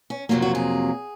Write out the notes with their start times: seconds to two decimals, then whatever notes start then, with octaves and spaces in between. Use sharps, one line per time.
0.10 C#4
0.29 F2 C3 F#3 A#3 F4
0.42 F#4
0.55 G#4